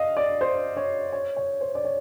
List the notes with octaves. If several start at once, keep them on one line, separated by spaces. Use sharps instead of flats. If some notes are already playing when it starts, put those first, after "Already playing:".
Already playing: D#5 F5
D5
C5
C#5
C#5
C#5
C5
D5
C#5